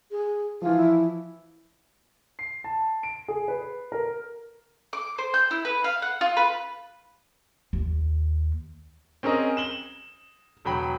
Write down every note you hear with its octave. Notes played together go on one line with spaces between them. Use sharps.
G#4
E3 F3 F4
E4
C7
A5
D7
G#4
B4
A#4
D6
C5
G6
E4
B4
F5
F#5
F4
B4
D#2
C4 C#4 G#4 A#4 D#5
E7 F#7 G7
E1 F#3 G5 B5